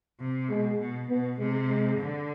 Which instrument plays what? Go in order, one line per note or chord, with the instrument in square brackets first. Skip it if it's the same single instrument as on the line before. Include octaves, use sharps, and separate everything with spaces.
[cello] C3
[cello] B2 [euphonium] G#3
[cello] B2
[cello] B2 [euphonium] B3
[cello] C3 [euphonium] G#3
[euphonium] G#3
[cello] D3